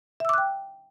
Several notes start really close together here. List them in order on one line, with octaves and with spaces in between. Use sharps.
E5 E6 D6 F#6 G5